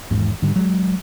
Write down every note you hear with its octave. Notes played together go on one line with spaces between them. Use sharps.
G#1 E2 G#2
G#2 D3 G3
F#3 G#3